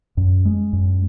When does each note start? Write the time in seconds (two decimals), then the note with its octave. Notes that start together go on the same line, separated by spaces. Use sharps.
0.17 F#2
0.45 G#3
0.73 F#2